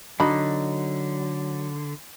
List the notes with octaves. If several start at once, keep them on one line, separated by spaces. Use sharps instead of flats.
D3 F#3 D4 D#4 F#4 B5